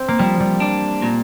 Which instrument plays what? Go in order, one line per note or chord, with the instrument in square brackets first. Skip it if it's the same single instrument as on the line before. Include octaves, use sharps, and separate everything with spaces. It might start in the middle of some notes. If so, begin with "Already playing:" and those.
Already playing: [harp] C4
A#3
[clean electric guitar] F3 [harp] G3
[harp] G3
[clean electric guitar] D4
A#2